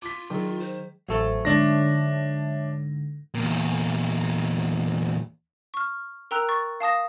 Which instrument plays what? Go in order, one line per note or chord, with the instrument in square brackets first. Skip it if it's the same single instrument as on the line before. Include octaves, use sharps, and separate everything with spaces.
[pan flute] F4 [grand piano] D6 B6
[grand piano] D#3 [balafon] F#3 G#4
[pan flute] C5
[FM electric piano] A1 [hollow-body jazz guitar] F#3 A3 A4 [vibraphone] C5 F#5
[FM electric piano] G#2 D3 [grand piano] D4 A#6 [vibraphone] C#5 E5 A5
[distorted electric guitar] E2 A#2
[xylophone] C#6 F6
A#4 G5 A#5 E6 F#6 F7
C#6 A6
F5 A5 D#6 A#6